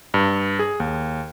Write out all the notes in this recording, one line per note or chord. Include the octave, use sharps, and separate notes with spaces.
G2
G#4
D#2